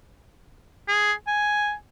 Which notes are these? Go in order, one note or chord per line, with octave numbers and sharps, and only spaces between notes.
G#4
G#5